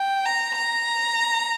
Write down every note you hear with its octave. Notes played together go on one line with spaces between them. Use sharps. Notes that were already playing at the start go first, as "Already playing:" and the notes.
Already playing: G5
A#5
A#5